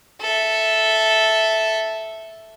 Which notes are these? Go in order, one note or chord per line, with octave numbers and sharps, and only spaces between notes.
A4 E5